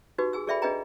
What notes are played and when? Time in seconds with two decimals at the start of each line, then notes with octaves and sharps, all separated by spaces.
0.18 D#4 F#4 G4 B4
0.33 G#4 G#5 E6
0.47 G#4 A4 D5 E5 G5 B5
0.62 D4 G#4 B4 D#5 G5 A#5